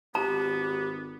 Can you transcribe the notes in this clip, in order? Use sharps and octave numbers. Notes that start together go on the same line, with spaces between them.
G#1 B3 G4 A#5